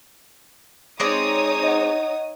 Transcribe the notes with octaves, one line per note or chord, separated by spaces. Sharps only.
G#3 C4 D#4 C#5 D5 D#6
D#5 F#5